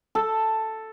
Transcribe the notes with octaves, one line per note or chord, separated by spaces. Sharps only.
A4